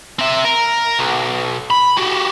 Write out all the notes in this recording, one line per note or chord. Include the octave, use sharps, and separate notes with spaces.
C4 E5
A#4
B1
B5
F#4 G4